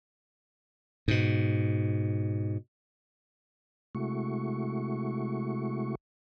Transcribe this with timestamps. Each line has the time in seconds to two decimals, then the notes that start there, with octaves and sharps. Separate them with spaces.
1.08 G#2 B2
3.95 C3 G#3 A3 E4 F#4 C#6